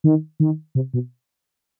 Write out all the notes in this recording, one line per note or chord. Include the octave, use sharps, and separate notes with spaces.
D#3
D#3
C3
B2